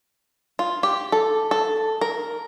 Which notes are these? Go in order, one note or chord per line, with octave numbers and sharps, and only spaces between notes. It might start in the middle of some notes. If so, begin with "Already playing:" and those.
F4
G4
A4
A4
A#4